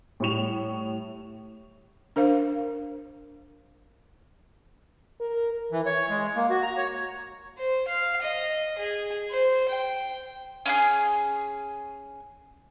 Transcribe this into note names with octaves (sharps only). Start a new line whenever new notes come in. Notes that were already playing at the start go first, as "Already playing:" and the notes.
A2 G3 C#6 F7
D4 A#4 C5 F5
A#4
E3
C#5
G#3
A#3
F#4
A#5
C#5
C5
F5
D#5
G#4
C5
G5
C#4 E4 G#4